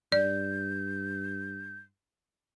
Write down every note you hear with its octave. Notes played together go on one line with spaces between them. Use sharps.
G2 D5 G6